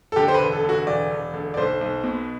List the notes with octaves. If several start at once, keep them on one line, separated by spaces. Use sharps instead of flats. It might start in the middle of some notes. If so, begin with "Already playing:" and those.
A4
D3 G4
C5
B4
E1
A4
D3
F#4
E1 D5
E1
D3
D5
B1 C5
B1
B2